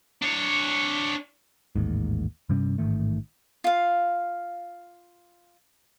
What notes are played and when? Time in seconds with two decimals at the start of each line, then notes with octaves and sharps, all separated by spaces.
0.22 D4 C#5
1.76 A1 D#2 G#2
2.49 G2 C3 G3 C#4
2.78 A1 G#2 D#3 A3
3.64 F4 F5